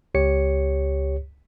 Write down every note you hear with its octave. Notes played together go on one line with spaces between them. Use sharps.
C#2 G4 C#5 C#7